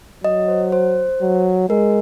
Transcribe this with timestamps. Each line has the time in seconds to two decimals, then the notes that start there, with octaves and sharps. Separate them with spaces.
0.24 F#3 D#5
0.48 C5
0.72 C5
1.22 F#3
1.70 G#3 A#4